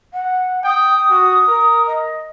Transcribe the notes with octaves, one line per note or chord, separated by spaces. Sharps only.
F#5
G5 D#6
F#4
A#4
D#5